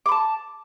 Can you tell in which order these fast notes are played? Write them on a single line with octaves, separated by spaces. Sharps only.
D6 B5 A5